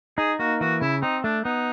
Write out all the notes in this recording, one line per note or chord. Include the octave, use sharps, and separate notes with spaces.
D#4 G#4
A#3 F#4
E3 F#4
C#3 E4
C4 D#4
A3 D4
B3 D#4